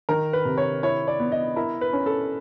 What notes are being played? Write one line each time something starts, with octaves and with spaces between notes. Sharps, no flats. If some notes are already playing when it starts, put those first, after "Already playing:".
D#3 A#4
B4
C3
C#5
E4 C#5
D5
B3
D#5
E4 A#4
B4
C#4
A4